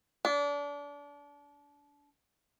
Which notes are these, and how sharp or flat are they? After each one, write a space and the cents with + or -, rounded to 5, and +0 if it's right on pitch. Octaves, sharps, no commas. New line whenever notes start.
D4 -30